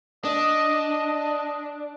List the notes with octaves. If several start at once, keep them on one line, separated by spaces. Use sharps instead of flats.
D4 D#5